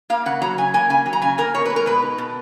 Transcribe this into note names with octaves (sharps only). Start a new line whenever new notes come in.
A#3 F5
C#3 F#5
F#3 A#5
C#3 G#5
A#3 G#5
C#3 G#5
F#3
A#5
C#3 G#5
A#3 A#4
B2 C#5
G#3 B4
A#4
B2 B4
D#4
B2